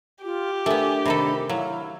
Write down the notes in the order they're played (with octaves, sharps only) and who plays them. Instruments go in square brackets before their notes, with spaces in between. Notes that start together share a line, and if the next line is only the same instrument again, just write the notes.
[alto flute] F4 [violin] G4
[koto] A3 B3 [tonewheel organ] D4 A#4 [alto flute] G#5
[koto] C3 D#3 A4 [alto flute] B5
[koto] F#3 [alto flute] E4 [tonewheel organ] F5